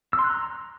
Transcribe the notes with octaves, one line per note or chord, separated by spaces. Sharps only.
E6
C6
F#6
A#5